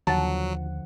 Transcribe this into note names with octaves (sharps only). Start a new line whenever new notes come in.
D#2 D3 F3 F#3 F#5 A5